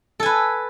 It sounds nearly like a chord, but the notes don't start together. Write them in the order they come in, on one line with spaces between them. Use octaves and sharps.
A4 G#5 B4